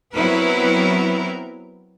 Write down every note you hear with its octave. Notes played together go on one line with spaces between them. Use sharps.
F#3 B3 C4 E4 A#4 B4